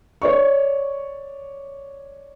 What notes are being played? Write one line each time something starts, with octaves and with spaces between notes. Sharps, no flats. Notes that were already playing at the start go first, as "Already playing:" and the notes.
C#5 D5 C#6